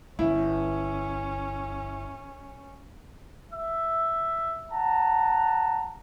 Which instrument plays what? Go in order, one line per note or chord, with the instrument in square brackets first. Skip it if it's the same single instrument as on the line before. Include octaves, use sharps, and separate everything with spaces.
[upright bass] G1 [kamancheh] C#4 [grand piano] E4
[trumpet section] E5
F#5 A5 A#5